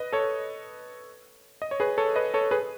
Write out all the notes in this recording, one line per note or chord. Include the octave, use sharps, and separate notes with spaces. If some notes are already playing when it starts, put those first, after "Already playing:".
Already playing: B4 D#5
A4 C#5
D#5
C#5
G#4 B4
A4 C#5
B4 D#5
A4 C#5
G#4 B4